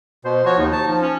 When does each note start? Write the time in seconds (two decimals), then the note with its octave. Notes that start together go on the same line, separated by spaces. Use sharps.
0.25 B2 C5
0.46 F3 F#4 C#5
0.57 D#2 D#4
0.72 A5
0.87 F3
1.01 C#4